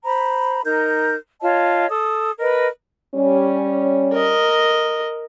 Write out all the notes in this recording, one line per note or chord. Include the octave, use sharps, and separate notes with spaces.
C5 A#5 B5
D#4 A#4 G6
F4 C#5 D#5 A5
A4 D#6
A#4 B4 D#5
G3 C#4
A#4 D#5